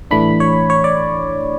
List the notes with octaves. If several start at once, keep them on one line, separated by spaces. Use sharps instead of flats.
A2 E3 A3 D4 B5
C#5
C#5
D5